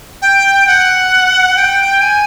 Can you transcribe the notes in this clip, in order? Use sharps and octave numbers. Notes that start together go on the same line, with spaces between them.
G5
F#5
G5
G#5